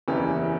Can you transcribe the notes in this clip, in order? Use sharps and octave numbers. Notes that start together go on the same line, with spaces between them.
F#1 E2 C#3 E3 G4